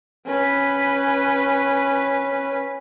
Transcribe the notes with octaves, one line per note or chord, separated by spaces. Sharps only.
C#4 B4